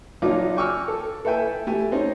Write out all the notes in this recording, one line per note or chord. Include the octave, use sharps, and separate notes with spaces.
A#1 F#3 D#4 F4 D6
G5 G#5 C#6 D6 E6 F6
A4
A4 B4 E5 G5 G#5
A3 G4 G#5
C#4 D#4 C5